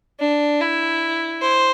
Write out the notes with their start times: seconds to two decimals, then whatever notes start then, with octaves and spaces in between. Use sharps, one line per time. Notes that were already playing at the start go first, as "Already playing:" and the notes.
0.20 D4
0.61 E4
1.41 C5